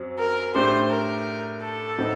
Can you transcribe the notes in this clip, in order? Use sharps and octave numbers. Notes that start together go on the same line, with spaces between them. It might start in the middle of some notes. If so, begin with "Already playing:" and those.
Already playing: F#2 F#3 C4
A#4
A2 A3 D4 G4 C5
A#4
A4
A2 F#3 C4 D#4